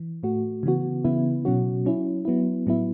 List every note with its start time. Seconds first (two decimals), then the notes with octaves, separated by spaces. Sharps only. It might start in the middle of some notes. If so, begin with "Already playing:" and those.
Already playing: E3
0.23 A2 A3 F#4
0.63 C#3 E3 B3 F#4
1.05 C#3 E3 B3 E4
1.45 B2 F#3 C#4 F#4
1.85 F#3 C#4 E4
2.25 F#3 B3 E4
2.67 A2 F#3 B3 E4